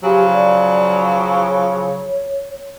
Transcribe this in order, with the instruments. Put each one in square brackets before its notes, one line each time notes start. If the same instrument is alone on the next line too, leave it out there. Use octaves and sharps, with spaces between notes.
[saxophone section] C#3 F3 F#3 [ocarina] G4
[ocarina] D5
C#5